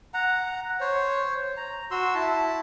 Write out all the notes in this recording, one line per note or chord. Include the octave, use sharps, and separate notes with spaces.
F#5 A#5
C5 C#5
A#5
F#4 C6 E6
E4 A5